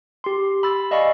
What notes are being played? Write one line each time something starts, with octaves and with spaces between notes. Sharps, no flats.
G4 C6
B5 E6 A6
D5 D#5 F5 G#5 B5 C#6